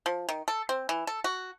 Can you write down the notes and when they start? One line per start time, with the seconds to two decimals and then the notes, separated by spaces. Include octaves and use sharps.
0.06 F3
0.29 D#3
0.48 A4
0.69 C4
0.89 E3
1.07 A4
1.24 F#4